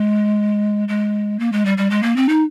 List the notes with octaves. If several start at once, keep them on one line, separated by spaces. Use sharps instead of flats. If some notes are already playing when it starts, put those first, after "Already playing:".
Already playing: G#3
G#3
A#3
G#3
G3
G3
G#3
A#3
C4
D#4